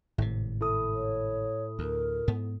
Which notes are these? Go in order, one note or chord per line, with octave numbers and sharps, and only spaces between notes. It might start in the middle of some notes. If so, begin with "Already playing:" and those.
G#1 A2 C3
E4 A4 D#6
C#5
D2 A#4
G#2 B3